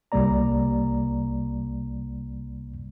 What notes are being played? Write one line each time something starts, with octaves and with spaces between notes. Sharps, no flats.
C2 C3 G3 A#3 D5 A#5